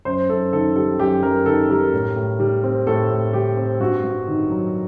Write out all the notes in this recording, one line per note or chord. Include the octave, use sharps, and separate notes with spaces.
F#2 C5
F#2 A4
D#3 A4
G3 A4
F#2 G4
F#2 A#4
D#3 A4
G3 A#4
A2
A2
G3
C4
A2 A4
A2
G3 G4
C4
G2 F#4
G2
D#3
F#3